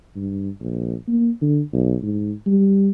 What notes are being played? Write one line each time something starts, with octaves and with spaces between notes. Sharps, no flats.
G2
A#1
A#3
D3
B1
G#2
G3